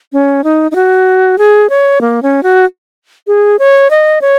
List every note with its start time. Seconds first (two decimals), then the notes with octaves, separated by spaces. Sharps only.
0.13 C#4
0.44 D#4
0.71 D#4
0.75 F#4
1.38 G#4
1.70 C#5
2.01 A#3
2.22 C#4
2.43 F#4
3.27 G#4
3.59 C#5
3.91 D#5
4.21 C#5